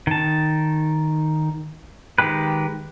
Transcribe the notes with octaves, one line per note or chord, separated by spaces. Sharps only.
D#3 A5
D#3 G#3 G4 B4